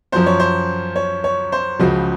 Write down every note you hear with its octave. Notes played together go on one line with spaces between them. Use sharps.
F#2 F3 C5
C#5
C5
C#5
C#5
C5
C#2 C#3 F3 F#4